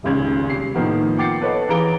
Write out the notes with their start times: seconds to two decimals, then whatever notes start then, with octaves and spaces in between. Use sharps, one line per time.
0.03 D#1 G#1 C#2 G#6
0.49 C3 C7
0.74 A2 D#3 F3 A#3 B3 D#4
1.17 F#5 G5 D6 A6 C7 C#7
1.41 A4 B4 C#5 D#5 F#5 A5
1.69 E3 G#4 F5 A#5 D7 G7